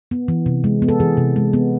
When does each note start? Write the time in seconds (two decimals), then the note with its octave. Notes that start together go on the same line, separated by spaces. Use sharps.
0.11 B3
0.28 E3
0.46 C3
0.64 G#3
0.82 B3
0.88 A4
1.00 E3 G#4
1.17 C3
1.36 G#3
1.53 B3